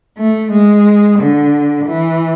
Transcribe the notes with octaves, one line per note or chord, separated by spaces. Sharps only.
A3
G#3
D3
E3